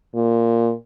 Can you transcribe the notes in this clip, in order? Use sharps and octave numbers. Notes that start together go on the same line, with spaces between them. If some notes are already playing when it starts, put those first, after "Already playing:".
A#2